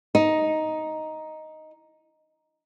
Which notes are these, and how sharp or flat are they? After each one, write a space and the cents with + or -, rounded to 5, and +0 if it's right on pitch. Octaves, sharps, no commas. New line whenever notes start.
D#4 +5